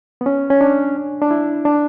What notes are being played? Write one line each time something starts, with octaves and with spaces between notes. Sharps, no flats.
B3
C#4
C#4
D4
D4
E4
D4